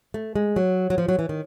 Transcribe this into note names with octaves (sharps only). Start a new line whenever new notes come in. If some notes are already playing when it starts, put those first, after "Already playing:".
A3
G#3
F#3
F#3
F3
F#3
E3
D#3